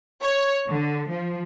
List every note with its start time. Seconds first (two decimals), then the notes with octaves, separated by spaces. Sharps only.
0.23 C#5
0.68 D3
1.09 F3